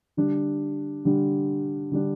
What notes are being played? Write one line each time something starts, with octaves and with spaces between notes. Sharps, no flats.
D3 G3 D4
D3 G3 D4
D3 G3 D4